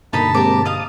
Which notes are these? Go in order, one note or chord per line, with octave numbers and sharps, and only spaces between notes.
G2 B2 D3 A#3 D#4 D#5 A5 B5
G#3 A#3 C4 G4 A#4 D6
D#5 F5 A5 D#6